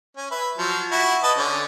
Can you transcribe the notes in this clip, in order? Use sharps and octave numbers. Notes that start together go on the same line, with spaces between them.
C#4
B4 E5
F3 F#3
E4 F#4
B4 D#5 A5
D3 C#4